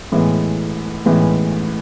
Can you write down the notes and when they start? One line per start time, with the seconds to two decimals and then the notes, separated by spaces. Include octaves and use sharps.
0.12 A2 E3 G#3 B3
1.05 A2 E3 G#3 B3